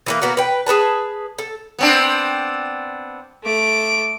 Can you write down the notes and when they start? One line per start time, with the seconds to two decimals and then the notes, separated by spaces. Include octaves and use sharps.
0.06 E3 G3 A#3
0.22 A#3 B3 F#4 A#4
0.37 B4 G5
0.66 G#4 A#4 B4 A5
1.38 A4
1.79 B3 C4 D4
3.44 A3 D6